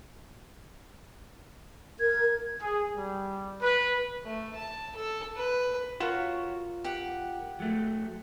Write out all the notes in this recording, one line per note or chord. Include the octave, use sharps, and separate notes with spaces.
A#4 G#6
G#4
G3
B4
A3
A5
A4
B4
F4 F#4 A#4 C#5
G4 F#5
F#3 A3